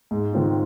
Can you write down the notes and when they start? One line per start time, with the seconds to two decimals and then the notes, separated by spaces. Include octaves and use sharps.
0.11 G#2
0.33 D#3 G#3 C4 F4